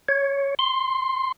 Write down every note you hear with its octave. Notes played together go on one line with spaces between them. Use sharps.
C#5
C6